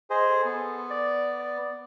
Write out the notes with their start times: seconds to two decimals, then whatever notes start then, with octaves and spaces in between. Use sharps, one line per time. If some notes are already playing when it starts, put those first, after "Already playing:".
0.10 G#4 C5 D#5
0.30 A4
0.45 B3
0.90 D5
1.39 D5